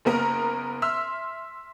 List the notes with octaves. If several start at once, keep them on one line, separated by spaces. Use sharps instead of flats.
F#1 A#3 B3 A#4 A#5
E5 C6 E6 F6